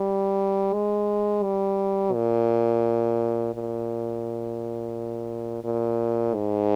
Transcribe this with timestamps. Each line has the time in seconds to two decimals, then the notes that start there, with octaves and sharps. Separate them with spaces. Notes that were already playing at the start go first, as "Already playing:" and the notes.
Already playing: G3
0.73 G#3
1.43 G3
2.14 A#2
3.54 A#2
5.64 A#2
6.34 G#2